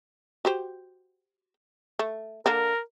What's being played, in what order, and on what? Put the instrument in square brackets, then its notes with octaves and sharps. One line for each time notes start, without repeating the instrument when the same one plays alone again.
[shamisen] F#4 G4 C5
A3
[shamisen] D3 A#3 D4 [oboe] A#4